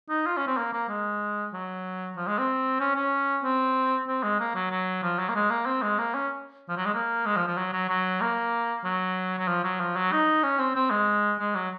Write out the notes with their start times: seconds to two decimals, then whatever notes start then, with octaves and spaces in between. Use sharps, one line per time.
0.09 D#4
0.26 F4
0.37 C#4
0.47 C4
0.57 A#3
0.73 A#3
0.89 G#3
1.53 F#3
2.16 F3
2.27 G#3
2.38 C4
2.80 C#4
2.96 C#4
3.44 C4
4.08 C4
4.23 G#3
4.40 A#3
4.55 F#3
4.71 F#3
5.03 F3
5.19 F#3
5.29 A#3
5.35 G#3
5.50 A#3
5.66 C4
5.82 G#3
5.98 A#3
6.14 C#4
6.69 F3
6.77 F#3
6.85 G#3
6.94 A#3
7.26 G#3
7.37 F3
7.47 F3
7.58 F#3
7.73 F#3
7.89 F#3
8.21 A#3
8.84 F#3
9.39 F#3
9.48 F3
9.64 F#3
9.80 F3
9.96 F#3
10.12 D#4
10.43 C#4
10.59 C4
10.76 C4
10.90 G#3
11.39 G#3
11.55 F#3